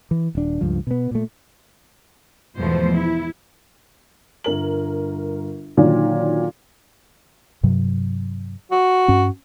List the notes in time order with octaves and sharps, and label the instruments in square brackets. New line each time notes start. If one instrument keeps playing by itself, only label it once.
[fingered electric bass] E3
D#1 D4
C#2 G2 F3
B2 B3
A#2 A3
[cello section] E2 G#2 B2 F3 A3 C5
E4
[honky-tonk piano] G1 A#4 F#7
A#2 D3 D#3 F#3
[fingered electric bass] G2 C3 F#3
[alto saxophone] F#4
[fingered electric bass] G2 C#4